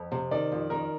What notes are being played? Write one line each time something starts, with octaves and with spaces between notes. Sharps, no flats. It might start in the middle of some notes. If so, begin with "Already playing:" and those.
Already playing: F2
C3
D#3 D5
F2
D#3 A#4